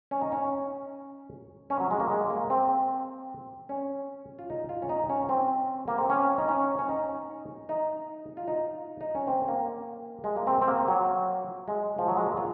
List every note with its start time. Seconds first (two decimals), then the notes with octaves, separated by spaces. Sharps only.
0.11 C#4
0.21 D#4
0.32 C#4
1.70 C#4
1.80 F#3
1.91 G#3
2.00 A#3
2.10 G#3
2.30 A#3
2.50 C4
3.69 C#4
4.39 F4
4.50 D#4
4.69 F4
4.82 C#4
4.89 D#4
5.09 C#4
5.29 C4
5.88 A#3
5.98 C4
6.10 C#4
6.38 D#4
6.48 C#4
6.79 C#4
6.89 D#4
7.69 D#4
8.37 F4
8.48 D#4
9.01 D#4
9.15 C#4
9.27 C4
9.48 A#3
10.24 G#3
10.37 A#3
10.47 C4
10.61 C4
10.68 A#3
10.88 F#3
11.68 G#3
11.98 F3
12.08 F#3
12.17 G#3
12.27 A#3
12.37 F4